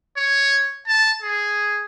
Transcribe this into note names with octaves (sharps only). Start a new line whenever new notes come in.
C#5
A5
G#4